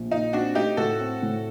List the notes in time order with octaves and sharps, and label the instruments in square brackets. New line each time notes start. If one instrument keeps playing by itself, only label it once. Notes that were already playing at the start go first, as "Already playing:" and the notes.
Already playing: [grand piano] A#1
[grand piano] A#2 [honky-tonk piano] D#4
[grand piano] C4 [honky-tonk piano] D4 F#4
[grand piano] A3 [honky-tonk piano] D#4 G4
[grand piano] A2 [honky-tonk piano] F#4 A4
[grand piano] C4
A2